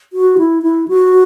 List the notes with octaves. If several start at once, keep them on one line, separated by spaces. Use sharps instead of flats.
F#4
E4
E4
F#4